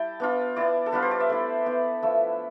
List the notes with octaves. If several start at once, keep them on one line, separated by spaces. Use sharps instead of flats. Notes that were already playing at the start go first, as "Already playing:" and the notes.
Already playing: G3 E4 G5 A5
B3 D4 F4
B3 E4 D5
A4
G3 B3 D4 F4 B4
C5
D5
E5
A3 E4 D5
B3 E4
F3 A3 E4 E5